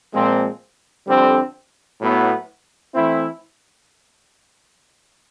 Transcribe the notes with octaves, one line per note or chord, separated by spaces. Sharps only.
A#2 F3 G#3 C4
F2 D3 G3 C4
A2 F#3 B3 E4
E3 A3 C4 E4